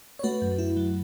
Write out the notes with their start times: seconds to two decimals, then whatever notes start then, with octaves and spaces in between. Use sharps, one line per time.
0.19 C#5
0.23 A3 F#4 B4
0.42 F#2
0.59 E4
0.77 F#3